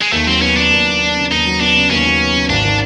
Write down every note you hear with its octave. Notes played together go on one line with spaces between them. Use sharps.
G#3
D#2 A3
F#3 C4
B3 C#4
C#3 D4
D#2
F#3
B3
C#3
D#2 D#4
F#3
B3 D4
C#3
D#2 C#4
F#3
B3
C#3
G#1 D4
D#3